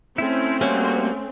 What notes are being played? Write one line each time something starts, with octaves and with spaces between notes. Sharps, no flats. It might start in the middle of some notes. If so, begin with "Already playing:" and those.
A3 C4 C#4 E4
G3 A#3 C#4 F#4